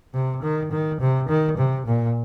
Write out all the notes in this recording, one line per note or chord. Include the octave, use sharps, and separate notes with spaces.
C3
D#3
D#3
C3
D#3
C3
A#2